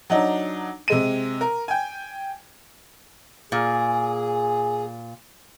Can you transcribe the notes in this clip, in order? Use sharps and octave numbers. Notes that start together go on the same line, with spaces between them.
F#3 D4 D#4
C3 G#3 D#7
A#4
G5 G#5
A#2 G#4